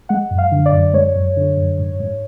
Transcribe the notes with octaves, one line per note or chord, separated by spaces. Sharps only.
G#3 F#5
F#2
F5
D3
D5
F#2
G#3 C#5
F#2
D3
F#2
G#2
G#2